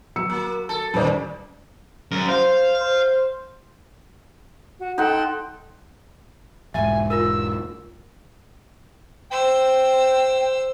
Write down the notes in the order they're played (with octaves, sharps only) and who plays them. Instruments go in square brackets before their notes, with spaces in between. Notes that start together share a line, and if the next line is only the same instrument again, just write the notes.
[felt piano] F#3 E6 C#7
[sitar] A#3
A4
[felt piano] D#1 C5 D5 [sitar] F#2 D#3
[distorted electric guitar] F#2 A#4
[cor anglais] C5 [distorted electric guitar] F5
[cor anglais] C5
[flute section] F#4
[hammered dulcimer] D#4 F#5 [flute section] A4 G5 C6
[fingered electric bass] E1 G#2 [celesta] E5 [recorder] G#5
[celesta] F4 A#4 [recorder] E6
[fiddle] C5 E6 [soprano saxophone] G5